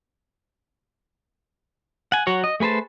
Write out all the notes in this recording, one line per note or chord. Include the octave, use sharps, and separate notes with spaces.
F#5 G#5
F#3 F#4 C#5
D#5
A3 G#4 B4 C5 A5